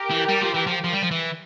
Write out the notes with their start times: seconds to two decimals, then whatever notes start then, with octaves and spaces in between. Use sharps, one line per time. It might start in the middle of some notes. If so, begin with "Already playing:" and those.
Already playing: G4 A#4
0.10 E3
0.28 G3
0.41 F3
0.54 E3
0.67 F3
0.84 F3
0.93 G3
1.02 F3
1.11 E3